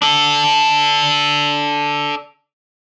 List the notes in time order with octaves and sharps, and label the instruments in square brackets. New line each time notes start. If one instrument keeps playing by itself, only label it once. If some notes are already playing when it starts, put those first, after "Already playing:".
[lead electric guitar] D4 A4